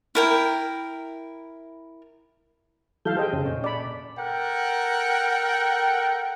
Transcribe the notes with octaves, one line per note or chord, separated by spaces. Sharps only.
E4 A#4 G5
E3 F#3 A4 F5 G6
G4 G#4 C5 D#5 G5
F2 C#3 C#4
A#2 C#4
D5 B5
A4 A#4 F#5 G5